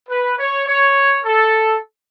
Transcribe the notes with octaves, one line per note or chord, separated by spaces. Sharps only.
B4
C#5
C#5
A4